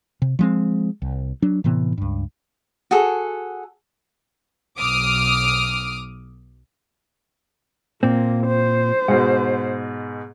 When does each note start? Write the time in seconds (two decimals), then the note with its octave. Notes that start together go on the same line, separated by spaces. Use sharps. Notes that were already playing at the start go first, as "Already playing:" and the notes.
0.22 C3
0.39 F3 G#3 C4
1.02 C2
1.42 F#3 D4
1.64 A2 C3 E3 B3
1.98 C#2 G2
2.91 F#4 G#4 A4
4.76 B1 D6 D#6 F6
8.03 A#2 A#3 C4
8.47 C5
9.08 G#2 B2 F#5